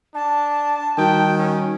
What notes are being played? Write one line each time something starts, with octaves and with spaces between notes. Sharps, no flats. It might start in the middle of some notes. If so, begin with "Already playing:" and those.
D4 A5
D#3 G3 D#4 F#4 G5
C#4